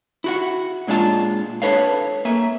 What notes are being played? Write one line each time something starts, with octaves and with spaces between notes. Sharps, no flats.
E4 F#4 F#5
A#2 G#3 D4 F4 A5
D4 E4 A4 B4 C#5 F5
A#3 E5 G#5